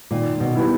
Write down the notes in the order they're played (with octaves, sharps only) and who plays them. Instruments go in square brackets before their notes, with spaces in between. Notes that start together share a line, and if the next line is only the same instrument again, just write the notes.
[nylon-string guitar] A#2 [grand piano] D#3
[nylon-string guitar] B2
[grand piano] G3 B3 E4